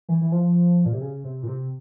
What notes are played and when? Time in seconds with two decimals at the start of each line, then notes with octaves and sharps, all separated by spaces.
0.09 E3
0.21 E3
0.32 F3
0.85 A#2
0.93 C3
1.01 C#3
1.24 C3
1.43 A#2
1.47 C3